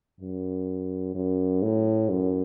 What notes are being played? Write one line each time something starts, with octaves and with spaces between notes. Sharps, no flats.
F#2
F#2
A2
F#2